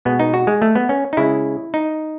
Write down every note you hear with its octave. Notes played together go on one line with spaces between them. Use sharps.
B2 G#3 B3
D#4
F#4
G#3
A3
B3
C#4
D#4
C#3 G#3 E4
D#4